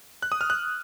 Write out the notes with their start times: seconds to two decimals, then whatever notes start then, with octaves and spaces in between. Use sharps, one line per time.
0.22 F#6
0.32 D#6
0.41 F6
0.50 F#6